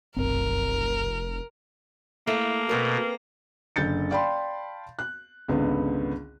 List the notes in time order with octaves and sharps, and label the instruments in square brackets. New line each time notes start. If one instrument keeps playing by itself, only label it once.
[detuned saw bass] F1 [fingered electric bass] B1 F#2 C4 [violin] A#4
[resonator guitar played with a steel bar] A3 [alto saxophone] A#3 [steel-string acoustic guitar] E4 F5
[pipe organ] B2 [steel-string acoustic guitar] B3 C4 A#4
[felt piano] F#1 D3 G6 A6 C#7
D5 F5 G5 A5 B5 C6
F#6
G#1 C#2 D3 B3